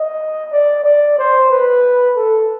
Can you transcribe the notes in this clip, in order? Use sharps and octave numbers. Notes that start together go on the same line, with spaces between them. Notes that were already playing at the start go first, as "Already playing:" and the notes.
Already playing: D#5
D5
D5
C5
B4
A4